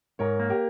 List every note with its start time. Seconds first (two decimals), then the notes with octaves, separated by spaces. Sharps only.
0.19 G#2 A#4 C#5
0.40 A#3
0.50 G4 A#4